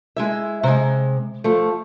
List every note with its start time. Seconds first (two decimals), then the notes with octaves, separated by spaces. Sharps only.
0.16 G#3 E4 E5
0.63 C3 G#3
1.44 F3 A3